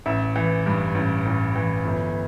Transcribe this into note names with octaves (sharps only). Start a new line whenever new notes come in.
A1 E5
E3
G2
A1
A1
E3
G1